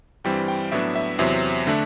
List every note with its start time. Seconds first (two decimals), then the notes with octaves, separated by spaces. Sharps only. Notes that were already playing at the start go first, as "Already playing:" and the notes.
0.24 G2 E3 G3 C4 G5
0.48 G5
0.72 A2 F#3 B3 D4 E5
0.96 E5
1.19 E2 C3 F#3 C4 E5
1.67 D3 A3 D4